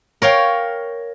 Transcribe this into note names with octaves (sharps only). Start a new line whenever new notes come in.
A#4 C#5 F5 G5